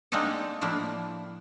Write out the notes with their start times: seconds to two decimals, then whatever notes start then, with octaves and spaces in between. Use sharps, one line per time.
0.12 G#3 A#3 C4 D4 D#4 A4
0.61 A2 F3 A#3 D4 E4